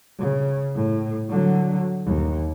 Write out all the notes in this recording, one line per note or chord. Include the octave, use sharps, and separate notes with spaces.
C#3
A2
D3 F#3
D#2